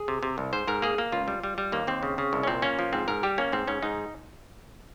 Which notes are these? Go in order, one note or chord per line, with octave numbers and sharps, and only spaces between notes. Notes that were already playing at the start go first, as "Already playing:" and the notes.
Already playing: G#4
C3
C3
C2
G#2 C5
G#2 A#4
A#3 G#4
A#3
C#2 F4
G3
G3
G3
D#2 A#3
D#2 C4
C#3
C#3
C2
C#4
A#2 C4
A#3 C#4
F3
G#2 C4
G#2 A#4
G3 G4
A#3 C#4
G#2 C4
G#2 C#4
G#2 D#4